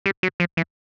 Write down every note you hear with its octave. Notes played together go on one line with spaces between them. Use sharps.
G3
F#3
F3
E3